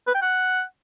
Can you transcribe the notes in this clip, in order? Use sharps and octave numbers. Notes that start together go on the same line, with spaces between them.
B4
G5
F#5